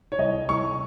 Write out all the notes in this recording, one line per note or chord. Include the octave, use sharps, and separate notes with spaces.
C#5
C2 D#5
C2 C#6